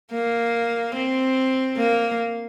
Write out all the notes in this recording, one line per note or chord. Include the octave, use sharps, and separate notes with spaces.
A#3
C4
A#3